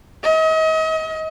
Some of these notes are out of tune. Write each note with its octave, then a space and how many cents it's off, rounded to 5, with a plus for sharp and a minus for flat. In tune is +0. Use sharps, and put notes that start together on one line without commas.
D#5 +35